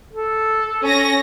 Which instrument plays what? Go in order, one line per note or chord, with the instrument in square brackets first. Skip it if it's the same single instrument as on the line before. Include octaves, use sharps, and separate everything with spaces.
[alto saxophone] A4
[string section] C#4 A#6